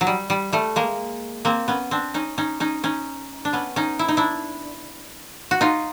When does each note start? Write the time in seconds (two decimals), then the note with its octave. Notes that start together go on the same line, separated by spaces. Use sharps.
0.01 F#3
0.07 G3
0.30 G3
0.53 G3 A3
0.76 G#3 A#3
1.45 A#3 C4
1.68 B3 C#4
1.91 C4 D4
2.14 C#4 D#4
2.38 C#4 D#4
2.60 C#4 D#4
2.84 C#4 D#4
3.45 D4
3.53 B3 C#4
3.76 C#4 D#4
3.99 E4
4.08 D#4
4.17 D4 E4
5.51 F#4
5.61 D#4 F4